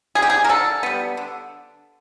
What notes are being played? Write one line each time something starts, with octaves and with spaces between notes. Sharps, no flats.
G3 B3 G#4
G4
G#4
A#4
D3 A4
G3 B3
D3